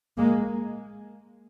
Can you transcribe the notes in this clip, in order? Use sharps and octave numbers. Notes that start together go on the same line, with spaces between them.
G#3 A#3